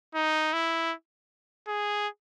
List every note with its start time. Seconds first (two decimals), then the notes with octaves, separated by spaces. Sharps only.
0.15 D#4
0.53 E4
1.68 G#4